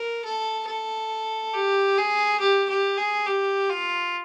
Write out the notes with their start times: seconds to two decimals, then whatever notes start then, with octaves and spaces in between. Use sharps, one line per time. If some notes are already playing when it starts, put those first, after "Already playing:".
Already playing: A#4
0.25 A4
0.67 A4
1.54 G4
1.97 G#4
2.40 G4
2.69 G4
2.97 G#4
3.26 G4
3.70 F4